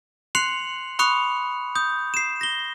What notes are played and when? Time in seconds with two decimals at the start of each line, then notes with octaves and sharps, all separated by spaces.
0.35 C6 F#6 C7 C#7 F7 F#7
0.99 B5 C#6 D#6 F#6 C#7 F7
1.75 D#6 G6
2.14 C7 E7
2.41 A#6 G7